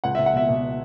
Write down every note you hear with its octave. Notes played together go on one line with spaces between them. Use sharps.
C#2 F#5
C#2 E5
F#5
B2 E5
B2